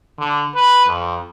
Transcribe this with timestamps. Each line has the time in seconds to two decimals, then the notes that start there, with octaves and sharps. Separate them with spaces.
0.18 D3
0.55 B4
0.86 F2